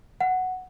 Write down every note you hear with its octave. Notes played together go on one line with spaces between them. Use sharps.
F#5